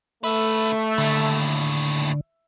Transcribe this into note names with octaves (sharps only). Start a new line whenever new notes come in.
D3 A3 B4 E5
D#2 A2 D3